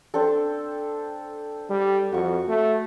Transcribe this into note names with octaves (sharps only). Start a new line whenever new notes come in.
C4 D4 A4
G3
F2 F#4 C#6
A3